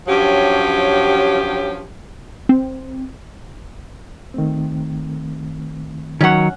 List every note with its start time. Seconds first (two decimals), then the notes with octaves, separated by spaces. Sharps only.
0.08 G2 F3 F#3 C#4 G4
2.49 C4
4.34 D#3 A3 C4
6.21 D#3 F#3 C#4 C#5 F#5